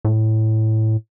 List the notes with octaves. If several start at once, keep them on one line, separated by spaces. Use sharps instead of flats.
A2